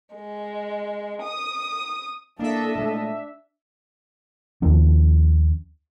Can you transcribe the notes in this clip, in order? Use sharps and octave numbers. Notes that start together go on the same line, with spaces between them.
G#3
D#6
A#3 D4 A4 D#5 E5
A#2 G#3 A3
D#2 D#3 F3 C#4